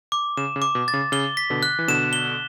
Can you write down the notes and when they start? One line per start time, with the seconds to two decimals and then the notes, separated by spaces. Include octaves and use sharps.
0.12 D6
0.37 C#3 E7
0.56 C#3
0.62 D6
0.75 B2
0.88 A6
0.93 C#3
1.12 C#3 G7
1.37 B6
1.50 B2 D3
1.63 F#6
1.79 E3
1.88 B2 D3 E7
2.13 G7